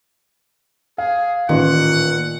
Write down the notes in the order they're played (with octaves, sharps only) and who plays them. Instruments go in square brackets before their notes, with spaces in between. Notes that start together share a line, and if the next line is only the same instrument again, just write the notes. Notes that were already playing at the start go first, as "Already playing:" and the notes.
[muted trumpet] G#4 [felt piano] F5
[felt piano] A1 [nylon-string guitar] A#2 [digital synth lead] D#3 [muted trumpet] F#5